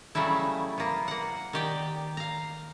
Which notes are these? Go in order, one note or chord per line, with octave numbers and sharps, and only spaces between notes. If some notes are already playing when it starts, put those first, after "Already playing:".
C#3 F#3 G3 A3 E4
A#3 B3
A#3 F#5
D#3 G4 D5
F5 A#5